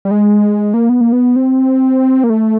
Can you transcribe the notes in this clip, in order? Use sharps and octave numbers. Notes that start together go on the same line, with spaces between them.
G3
G#3
A#3
B3
A#3
B3
C4
A#3
A3